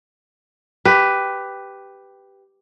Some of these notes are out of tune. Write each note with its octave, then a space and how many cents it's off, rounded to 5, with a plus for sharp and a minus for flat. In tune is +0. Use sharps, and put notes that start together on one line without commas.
G4 +0 B4 +10